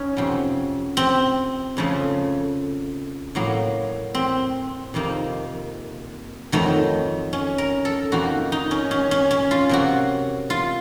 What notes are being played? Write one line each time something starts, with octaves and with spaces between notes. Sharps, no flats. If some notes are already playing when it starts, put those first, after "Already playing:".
Already playing: C#4 D#4
F2 C3 F#3
C4
F2 C#3 F3 A3
A2 F#3 A#3
C4
F2 C3 D#3 A#3
F2 D#3 F#3 A3
C#4
A#4
A4
F2 D#3 A#3 F#4
D#4
C#4
C#4
C#4
C#4
F4
C3 F#3 A#3 F#4
F4